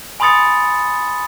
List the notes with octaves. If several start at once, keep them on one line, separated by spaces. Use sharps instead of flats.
G#5 B5 C6 D#6 A6 C#7